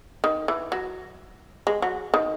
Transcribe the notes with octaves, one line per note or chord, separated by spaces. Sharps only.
D#3
E3
F#3
G#3
F#3
D#3